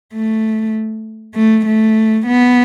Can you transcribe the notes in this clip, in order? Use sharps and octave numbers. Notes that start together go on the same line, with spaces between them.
A3
A3
A3
B3